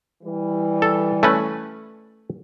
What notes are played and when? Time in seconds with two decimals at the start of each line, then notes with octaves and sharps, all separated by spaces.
0.23 E3 G3
0.82 A4
1.23 A3 C#4 B4